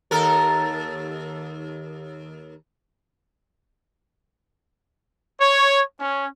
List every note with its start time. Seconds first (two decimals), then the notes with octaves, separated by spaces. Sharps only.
0.11 D#2 A4 A#4
5.40 C#5
6.00 C#4